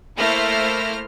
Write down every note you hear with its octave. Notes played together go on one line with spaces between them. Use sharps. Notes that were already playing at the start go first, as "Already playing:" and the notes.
A3 A#3 E4 C5 F6 A#6